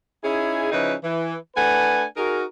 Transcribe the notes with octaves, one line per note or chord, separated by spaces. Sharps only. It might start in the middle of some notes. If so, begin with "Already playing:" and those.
C#4 D#4 E4 G#4
C#3 F3 C#4 D#4 E4 B4
E3
A3 D4 B4 F#5 G#5
D#4 F#4 G#4 A#4